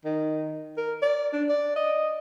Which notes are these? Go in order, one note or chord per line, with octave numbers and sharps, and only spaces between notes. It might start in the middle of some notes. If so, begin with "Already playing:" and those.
D#3
A#4
D5
D4
D5
D#5